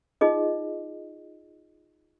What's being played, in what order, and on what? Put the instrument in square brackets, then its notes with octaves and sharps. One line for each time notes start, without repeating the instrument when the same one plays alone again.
[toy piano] D#4 F4 G#4 D#5